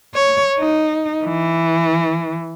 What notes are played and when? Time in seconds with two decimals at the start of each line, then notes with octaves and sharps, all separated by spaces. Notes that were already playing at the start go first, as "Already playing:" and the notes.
0.14 C#5
0.59 D#4
1.25 E3